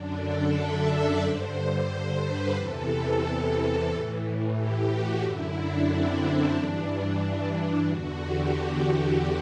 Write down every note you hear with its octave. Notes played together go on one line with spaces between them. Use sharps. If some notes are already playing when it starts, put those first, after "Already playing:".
Already playing: F#2 D3 D4
A4
E5
D5
G2 D3 C5
C5
B4
E2 C3 E3 A4
A2 E3
G4
F#4
F#2 D3 E4
D4
C4
G2 E3 D4
E2 D3 F#4
G4
G4